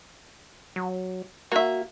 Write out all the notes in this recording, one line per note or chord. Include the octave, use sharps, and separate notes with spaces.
F#3
A#3 F#4 E5